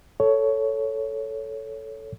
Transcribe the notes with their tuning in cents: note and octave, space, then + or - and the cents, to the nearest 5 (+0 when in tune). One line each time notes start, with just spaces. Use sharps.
A4 +0 C#5 +10